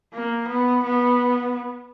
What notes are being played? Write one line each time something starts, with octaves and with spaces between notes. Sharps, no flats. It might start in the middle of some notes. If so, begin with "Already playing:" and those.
A#3
B3
B3